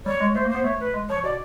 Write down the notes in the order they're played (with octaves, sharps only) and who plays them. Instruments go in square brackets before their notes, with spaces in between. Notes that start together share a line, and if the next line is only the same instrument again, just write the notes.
[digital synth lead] G3 [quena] C#5
[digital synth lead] G#3
[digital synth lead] A3 [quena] C5
[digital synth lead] A#3
[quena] C5
[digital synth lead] B3
[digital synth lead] A3 [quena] C#5
[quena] B4
[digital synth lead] G#3
[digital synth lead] F3 [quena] C#5
[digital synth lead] B2 [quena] D5